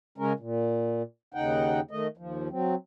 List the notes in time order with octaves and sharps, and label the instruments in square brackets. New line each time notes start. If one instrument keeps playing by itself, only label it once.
[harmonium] C#3 G#3 C#4 A#4
A#2
D#2 C#3 D#4 F#5 G5
D#3 A3 D#5
D#2 F3
F#3 C4